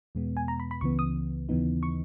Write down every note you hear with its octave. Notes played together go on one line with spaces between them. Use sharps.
E2 B2 G#3 B3
G#5
A#5
B5
B5
C#2 C#3 E3 B3 C#6
D#6
D#2 C#3 E3 B3 D#4
C#6